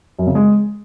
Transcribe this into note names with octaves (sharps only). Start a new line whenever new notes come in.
F#2
C#3
G#3